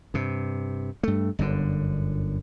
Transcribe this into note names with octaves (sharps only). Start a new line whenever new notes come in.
G2 C3
G2 A3
G1 F#2 D3